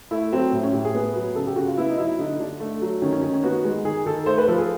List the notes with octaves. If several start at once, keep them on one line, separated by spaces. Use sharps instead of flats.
A3 E4
F#3 C4
A2
C#4
A2 G4
G#4
B3
F#3
C#3 A4
G4
C#3 F#4
F4
B3 E4
D#4
F#3 E4
D3 D#4
D3 D4
A3
F#3
D#3 C#4
C#4
D#3 C#4
C#4
B3 F#4
G#3
D#3 G#4
D#3 A4
A3 C5
B4
F3 A4
G#4